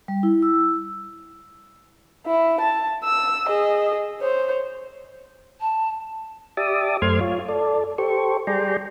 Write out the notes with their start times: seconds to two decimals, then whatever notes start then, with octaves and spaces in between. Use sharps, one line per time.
0.08 G3
0.23 E4
0.42 E6
2.26 E4
2.60 A5
3.04 E6
3.48 G#4 D#5
4.20 C5 C#5
5.60 A5
6.57 G4 D5 E5 A5 D6 D#6
7.02 F#2 A3 C5 C6 F6 G#6
7.21 F4 C#5
7.49 A4 D5
7.98 G4 A4 C5 C#6
8.47 G3 G#4 D5 G5 A#5 C6